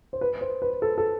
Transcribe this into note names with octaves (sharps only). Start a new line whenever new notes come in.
C5
B4
C5
B4
A4
A4